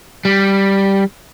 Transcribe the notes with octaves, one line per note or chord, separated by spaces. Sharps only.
G3